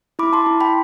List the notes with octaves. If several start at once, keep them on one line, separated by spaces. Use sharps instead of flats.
E4 B5 D6
A5 C6
E4
G5 B5